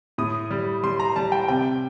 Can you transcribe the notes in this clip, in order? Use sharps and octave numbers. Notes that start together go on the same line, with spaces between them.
A2 D#6
G3
G3 C6
A#5
G3 A5
G5
C3 G5